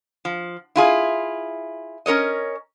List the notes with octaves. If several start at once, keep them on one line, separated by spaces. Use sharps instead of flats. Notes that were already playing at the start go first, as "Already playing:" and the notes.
F3
E4 F4 G#4
C#4 A#4 C#5 D#5